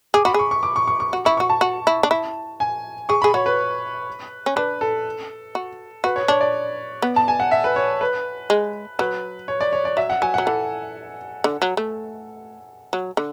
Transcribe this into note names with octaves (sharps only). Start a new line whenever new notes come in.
G#4 D6
F#4 B5
G#4 C#6
C#6
D6
C#6
C#6
C#6
F#4
E4 C#6
F#4 C#6
A5
F#4
E4
D4
E4
G#5
G#4 C#6
G#4 B5
F#4 C#5
B4
C#4
D4 B4
A4
F#4
F#4 B4
C#5
D4 C#5
D5
B3
A5
G#5
F#5
E5
B4
C#5
B4
G#3
F#3 B4
C#5
D5
C#5
D5
F#3 E5
F#5
F#3 G#5
F#5
F#3
E3 A4
D3
F#3
A3
F#3
D3